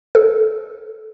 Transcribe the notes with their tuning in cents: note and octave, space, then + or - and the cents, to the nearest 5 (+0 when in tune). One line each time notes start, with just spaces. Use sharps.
A4 -10